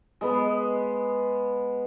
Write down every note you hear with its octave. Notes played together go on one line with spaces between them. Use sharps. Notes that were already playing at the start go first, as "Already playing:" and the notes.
G#3 B3 B4